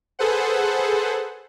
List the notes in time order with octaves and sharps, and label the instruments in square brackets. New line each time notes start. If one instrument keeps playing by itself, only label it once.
[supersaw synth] G#4 A4 B4 C5 F#5